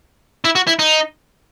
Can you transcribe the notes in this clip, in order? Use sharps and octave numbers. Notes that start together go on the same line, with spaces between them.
E4
F#4
E4
D#4